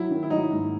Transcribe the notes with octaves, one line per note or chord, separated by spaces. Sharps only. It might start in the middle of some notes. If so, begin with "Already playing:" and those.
Already playing: F#3 E4
D#3
E4
F#3 D#4
G#2